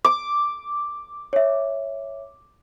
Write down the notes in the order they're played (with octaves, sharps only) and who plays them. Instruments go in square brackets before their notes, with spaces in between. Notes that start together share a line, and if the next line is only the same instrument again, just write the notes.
[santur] D6
[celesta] C#5 E5